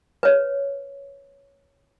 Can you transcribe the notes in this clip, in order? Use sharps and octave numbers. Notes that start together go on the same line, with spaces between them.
B4 C#5